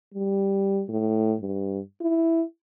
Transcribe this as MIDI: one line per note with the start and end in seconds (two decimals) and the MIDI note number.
0.14 0.82 55
0.89 1.35 45
1.41 1.79 43
2.01 2.43 64